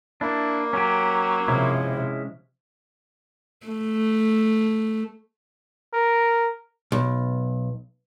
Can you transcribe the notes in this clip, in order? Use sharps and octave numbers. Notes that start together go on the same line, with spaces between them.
A#3 D4 E4
F#3 C#4 G4
C3 F3 G#3 C#4 E4
A3
A#4
B1